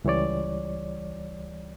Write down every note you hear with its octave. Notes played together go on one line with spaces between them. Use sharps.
C#2 E3 G3 C#5 D5